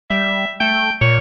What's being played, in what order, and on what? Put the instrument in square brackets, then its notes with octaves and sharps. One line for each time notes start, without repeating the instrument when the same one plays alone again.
[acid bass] G3 [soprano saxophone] E5
[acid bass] A3 [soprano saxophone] G5
[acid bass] A#2 [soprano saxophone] C#5